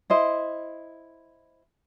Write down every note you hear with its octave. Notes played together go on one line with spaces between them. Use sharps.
E4 C5 D#5